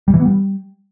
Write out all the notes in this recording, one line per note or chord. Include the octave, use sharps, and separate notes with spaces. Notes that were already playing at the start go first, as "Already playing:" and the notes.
G3
E3
B3
G3